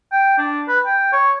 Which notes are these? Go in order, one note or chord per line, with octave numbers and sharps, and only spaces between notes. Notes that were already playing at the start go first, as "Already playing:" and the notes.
G5
D4
B4
G5
C#5